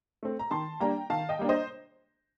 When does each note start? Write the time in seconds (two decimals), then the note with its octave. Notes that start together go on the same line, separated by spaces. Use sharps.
0.23 A3 C4
0.39 A#5
0.51 D#3 A5 C6
0.80 G3 A#3 D4 G5 A#5
1.10 D#3 F5 A5
1.29 D#5 G5
1.39 G3 A#3 D4
1.49 C5 D#5